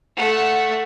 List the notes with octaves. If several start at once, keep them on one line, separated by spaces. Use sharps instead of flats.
A3 F#5